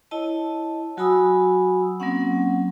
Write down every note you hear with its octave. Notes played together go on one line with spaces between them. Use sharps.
E4 C#5 D#5 A5
F#3 F#4 G#5 B5 D#6 E6
F#3 A#3 C4 C#4 F#5